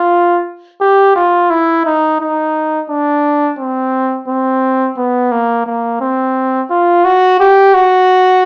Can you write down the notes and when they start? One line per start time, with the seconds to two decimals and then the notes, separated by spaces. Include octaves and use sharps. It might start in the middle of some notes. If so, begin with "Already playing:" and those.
Already playing: F4
0.81 G4
1.16 F4
1.50 E4
1.86 D#4
2.21 D#4
2.90 D4
3.58 C4
4.28 C4
4.97 B3
5.32 A#3
5.66 A#3
6.01 C4
6.70 F4
7.05 F#4
7.40 G4
7.74 F#4